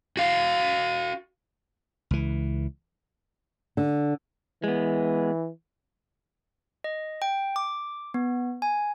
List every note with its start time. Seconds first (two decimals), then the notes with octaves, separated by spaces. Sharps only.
0.17 F#4 F5
2.11 C#2 E3
3.77 D3
4.64 E3 G#3 B3
6.84 D#5
7.22 G5
7.56 D6
8.14 B3
8.62 G#5